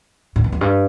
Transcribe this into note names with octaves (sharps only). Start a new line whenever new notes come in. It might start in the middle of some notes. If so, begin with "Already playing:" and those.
A2
G2
F2
G2